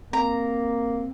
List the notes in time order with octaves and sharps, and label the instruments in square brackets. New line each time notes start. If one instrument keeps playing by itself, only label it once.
[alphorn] A#3 [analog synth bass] C4 [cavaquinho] A#5